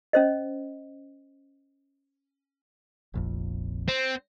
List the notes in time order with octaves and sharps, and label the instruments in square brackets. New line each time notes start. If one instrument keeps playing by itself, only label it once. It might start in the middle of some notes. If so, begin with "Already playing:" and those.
[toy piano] C#4 C5 D#5
[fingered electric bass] F1 A#1 F2
[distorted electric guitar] C4